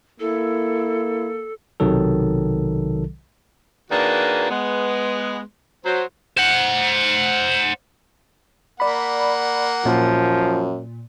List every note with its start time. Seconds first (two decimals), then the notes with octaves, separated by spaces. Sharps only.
0.20 A#3 E4 A4
1.80 B1 C3 D#3 F#3 A4
3.90 D#3 A#3 D4 F#4 G#4 B4
4.50 G#3 B3
5.85 F#3 C5
6.38 C5 F#5
8.80 A#3 D5 F#5 B5
9.85 F#2 A#2 F3